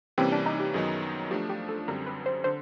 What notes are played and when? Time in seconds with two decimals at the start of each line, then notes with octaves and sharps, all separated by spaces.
0.18 C3 E3 G3 A#3 C4 C#4
0.32 D4
0.46 D#4
0.60 G4
0.74 F#2 D#3 F#3 B3 D#4 G#4
1.31 F3 A3 D4 G4
1.50 G4
1.69 A4
1.88 F#2 D3 G3 C4 A#4
2.07 B4
2.26 C5
2.44 D3 C5